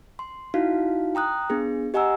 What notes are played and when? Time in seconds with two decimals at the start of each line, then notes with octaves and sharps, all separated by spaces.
0.19 C6
0.54 D#4 E4 F#4 F5
1.15 G5 A#5 D#6 F#6
1.50 B3 D4 G#4
1.94 G4 D#5 F#5 G#5 A#5 E6